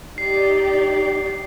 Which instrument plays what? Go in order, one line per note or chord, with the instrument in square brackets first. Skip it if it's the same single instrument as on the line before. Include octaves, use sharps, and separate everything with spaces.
[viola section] D#4 G4 D5 [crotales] C7